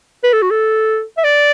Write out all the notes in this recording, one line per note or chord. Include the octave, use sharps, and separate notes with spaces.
B4
A4
F#4
A4
E5
D5